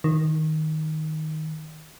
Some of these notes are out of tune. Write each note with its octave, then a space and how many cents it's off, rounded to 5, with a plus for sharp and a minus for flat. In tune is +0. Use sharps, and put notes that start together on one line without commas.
D#3 +5